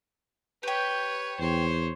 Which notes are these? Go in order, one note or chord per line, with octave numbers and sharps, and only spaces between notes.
G4 B4 C#5 G5
E2 C5 C#5